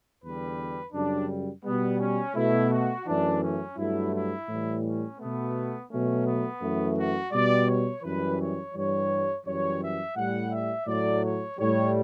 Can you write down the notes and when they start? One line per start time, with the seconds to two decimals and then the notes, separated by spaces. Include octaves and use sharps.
0.22 E2 D3 G3 B4
0.93 F#2 C#3 G3 D4
1.64 B2 G3 B3
2.00 C#4
2.35 B2 A3 E4
2.70 F#4
3.06 F#2 E3 A3 D4
3.41 C#4
3.77 G2 F#3 A3 E4
4.12 E4
4.48 A2 E3 G3
4.83 C#4
5.19 B2 A3 B3
5.90 B2 F#3 A3 C#4
6.25 B3
6.61 F#2 E3 A3
6.96 F#4
7.32 B2 G3 D5
7.67 C#5
8.02 F#2 E3 G3 B4
8.39 C#5
8.74 G2 E3 G3 C#5
9.45 F#2 E3 G3 C#5
9.81 E5
10.16 A2 G3 F#5
10.52 E5
10.87 A2 F#3 A3 D5
11.23 C#5
11.57 A2 G3 C#5